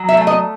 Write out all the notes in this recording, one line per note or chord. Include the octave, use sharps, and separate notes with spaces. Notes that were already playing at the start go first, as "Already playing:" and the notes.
Already playing: F#3
E5
A3
D#5